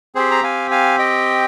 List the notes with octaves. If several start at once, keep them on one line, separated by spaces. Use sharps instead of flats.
C4 G4 G#4 C5
A#5
F5 G#5
F5 G#5
D#5 G5